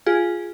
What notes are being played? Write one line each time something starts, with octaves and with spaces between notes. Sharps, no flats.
F4 G#4